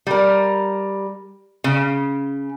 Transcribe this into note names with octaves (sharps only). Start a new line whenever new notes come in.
G3 A#4
C#3